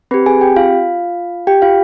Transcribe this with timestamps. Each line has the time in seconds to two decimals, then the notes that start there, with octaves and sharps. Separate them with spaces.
0.11 C4 G4 B4 B5
0.26 G#4 G#5
0.41 G4 G5
0.56 F4 F5
1.47 G4 G5
1.62 F4 F5